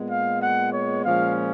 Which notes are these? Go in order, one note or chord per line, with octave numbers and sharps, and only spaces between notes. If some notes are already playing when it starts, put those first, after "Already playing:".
Already playing: A#2 G#3 B3
F5
F#5
C#5
A#2 F3 G#3 C#4 F5